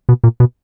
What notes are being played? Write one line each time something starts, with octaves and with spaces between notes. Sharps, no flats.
B2
A#2
B2